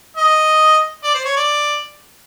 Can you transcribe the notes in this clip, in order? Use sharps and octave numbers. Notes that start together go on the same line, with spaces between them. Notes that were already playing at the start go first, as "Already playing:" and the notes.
D#5
D5
C5
C#5
D5